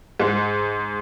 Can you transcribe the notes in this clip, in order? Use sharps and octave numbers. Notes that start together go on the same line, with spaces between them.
G#2